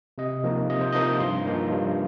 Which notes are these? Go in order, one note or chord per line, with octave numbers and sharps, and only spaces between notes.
C3 D#5
F3 A#3 D#4
C3 D#5
C5
F3 A#3 D#4 D#5
G2 C6
F3 A#3 D#4
G2